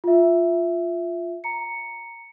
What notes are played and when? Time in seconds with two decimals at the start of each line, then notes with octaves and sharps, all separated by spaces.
0.04 F4 E5
1.44 A#5 C#7